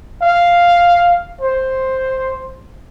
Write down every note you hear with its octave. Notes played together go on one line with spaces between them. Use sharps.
F5
C5